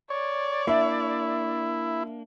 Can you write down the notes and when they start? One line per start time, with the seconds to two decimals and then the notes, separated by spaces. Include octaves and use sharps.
0.10 C#5 D5
0.67 A#3 D4 E4 E5